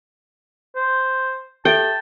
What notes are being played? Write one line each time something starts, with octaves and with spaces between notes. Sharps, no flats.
C5
G4 A4 E5 G5 A5